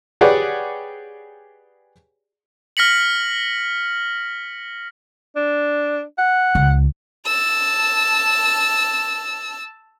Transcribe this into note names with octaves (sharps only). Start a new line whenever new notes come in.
G4 G#4 B4 C#5 D5 F#5
F6 A#6 B6 C#7 F#7
D4
F#5
C#2
A5 E6